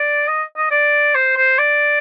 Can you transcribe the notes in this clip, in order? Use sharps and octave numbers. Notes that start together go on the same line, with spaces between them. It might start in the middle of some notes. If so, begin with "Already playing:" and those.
Already playing: D5
D#5
D#5
D5
C5
C5
D5